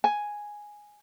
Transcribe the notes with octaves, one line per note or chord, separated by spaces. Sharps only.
G#5